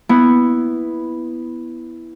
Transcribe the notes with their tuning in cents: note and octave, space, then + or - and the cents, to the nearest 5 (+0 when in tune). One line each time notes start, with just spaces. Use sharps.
B3 +0 E4 +0